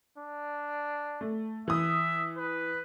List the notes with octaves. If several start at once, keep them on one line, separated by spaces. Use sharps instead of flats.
D4
A3
E3 E5 D#6
B4